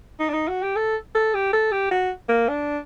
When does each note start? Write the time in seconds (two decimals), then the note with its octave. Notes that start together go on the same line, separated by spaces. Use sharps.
0.20 D#4
0.29 D4
0.34 D#4
0.48 F#4
0.63 G4
0.76 A4
1.15 A4
1.34 G4
1.53 A4
1.72 G4
1.91 F#4
2.29 A#3
2.49 D4